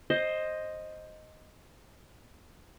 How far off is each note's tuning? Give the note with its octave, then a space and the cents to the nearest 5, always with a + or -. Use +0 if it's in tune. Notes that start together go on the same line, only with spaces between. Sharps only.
C5 +10 D#5 +0